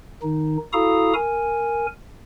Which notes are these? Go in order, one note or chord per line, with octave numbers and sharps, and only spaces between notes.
D#3 D#4
E4 F#4 A4 F5 A#5 D#6
A#4 G#5